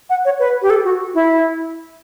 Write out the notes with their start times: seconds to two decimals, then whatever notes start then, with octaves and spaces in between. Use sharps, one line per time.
0.10 F#5
0.25 C#5
0.39 B4
0.62 G4
0.70 A4
0.85 F#4
1.15 E4